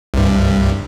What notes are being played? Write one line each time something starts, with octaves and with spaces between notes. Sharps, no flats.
C2 G2